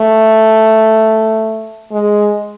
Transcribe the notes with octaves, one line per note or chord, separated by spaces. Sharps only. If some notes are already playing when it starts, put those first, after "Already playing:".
Already playing: A3
G#3